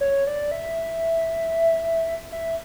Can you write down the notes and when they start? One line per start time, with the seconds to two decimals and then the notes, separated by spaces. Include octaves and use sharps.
0.01 C#5
0.27 D5
0.52 E5
2.32 E5